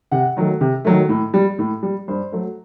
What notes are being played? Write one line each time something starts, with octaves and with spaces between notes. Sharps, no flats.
C3 F#5
D#3 F#3 A3
C3
D#3 F#3 A3
A2
G3
A2
G3
G2 C5
F#3 A3